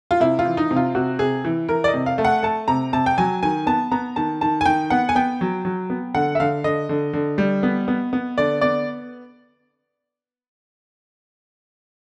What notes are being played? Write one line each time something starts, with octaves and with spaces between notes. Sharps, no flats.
F4
C3 E4
F4
E3
D#4
C3
F4
C3 F#4
C3 G#4
E3
E3 A#4
D5
D#5
C3
F5
A3
F#5
A3 A5
C3 A#5
C3 A5
G5
F#3 G#5
D#3 G#5
B3 A5
B3 A#5
D#3 A5
D#3 A5
G#5
D#3 G5
B3 F#5
G#5
B3 G5
F#3
F#3
B3
D3 F#5
E5
D3 F5
D3 D#5
D3
D3
G3
B3
B3
B3
D3 D5
B3 D5